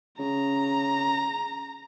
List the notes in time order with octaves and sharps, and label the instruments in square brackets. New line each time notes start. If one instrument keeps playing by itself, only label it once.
[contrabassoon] C#3 [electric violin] A#5